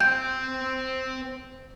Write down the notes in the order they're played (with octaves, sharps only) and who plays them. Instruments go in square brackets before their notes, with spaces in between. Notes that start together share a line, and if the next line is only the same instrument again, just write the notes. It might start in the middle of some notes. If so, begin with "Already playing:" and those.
[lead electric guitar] C5 G5 [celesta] G6